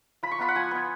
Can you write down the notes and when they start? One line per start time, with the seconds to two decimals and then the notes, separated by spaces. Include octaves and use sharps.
0.23 F3 B5
0.31 C#6
0.39 B3 F4 B5
0.48 F#5
0.55 F3 G#5
0.71 B3 F4